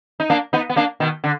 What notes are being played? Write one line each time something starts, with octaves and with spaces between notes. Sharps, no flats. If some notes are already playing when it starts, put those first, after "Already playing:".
D#4
A#3 D4
B3 D#4
B3
A#3 D4
B2 D#3
D3